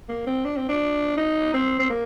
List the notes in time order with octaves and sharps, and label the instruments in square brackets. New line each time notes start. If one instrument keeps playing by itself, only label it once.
[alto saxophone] A#3
C4
D4
C4
D4
D#4
C4
C4
A#3